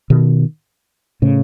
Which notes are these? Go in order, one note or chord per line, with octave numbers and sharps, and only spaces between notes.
B2 D#3
A2 C#3